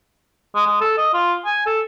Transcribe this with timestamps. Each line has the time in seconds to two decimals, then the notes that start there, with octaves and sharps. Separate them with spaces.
0.55 G#3
0.67 G#3
0.81 A4
0.98 D#5
1.14 F4
1.45 G#5
1.66 A4